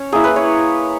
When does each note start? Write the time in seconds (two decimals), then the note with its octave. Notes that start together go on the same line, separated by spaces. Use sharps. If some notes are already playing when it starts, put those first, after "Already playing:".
Already playing: C#4 C#5
0.12 A#3 E4 G#4
0.24 B4
0.36 C#5